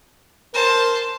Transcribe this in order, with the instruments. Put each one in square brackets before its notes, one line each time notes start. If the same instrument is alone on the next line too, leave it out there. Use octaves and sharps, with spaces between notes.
[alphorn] A#4 [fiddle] C5 A5